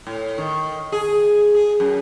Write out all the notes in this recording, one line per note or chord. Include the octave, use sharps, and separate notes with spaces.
A2
D#3
G#4
G#4
F#2